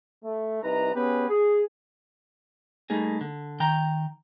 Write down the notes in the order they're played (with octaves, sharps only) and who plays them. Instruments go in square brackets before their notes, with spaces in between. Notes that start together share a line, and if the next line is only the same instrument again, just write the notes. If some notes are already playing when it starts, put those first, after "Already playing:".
[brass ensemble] A3
C2 D#4 B4 A#5
B3 C#4 G4 G#4 B4
G#4
[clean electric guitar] G3 A3 A#3 D#4 G#4
D3
D#3 G5 A#5